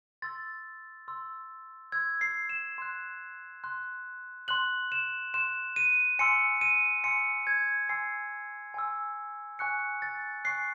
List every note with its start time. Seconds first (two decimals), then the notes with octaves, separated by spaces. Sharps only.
0.22 C6 E6 A6
1.08 C6 E6
1.92 C6 E6 G#6
2.21 C7
2.49 E7
2.78 C6 F#6
3.64 C6 F#6
4.48 C6 F#6 F#7
4.92 E7
5.34 C6 F#6 E7
5.76 D#7
6.19 G#5 C6 E6 C#7
6.61 D#7
7.04 G#5 C6 E6 C#7
7.47 G#6
7.89 G#5 C6 E6 C7
8.74 G#5 C6 E6
9.59 G#5 C#6 F#6 C#7
10.02 A6
10.45 G#5 C#6 F#6 C7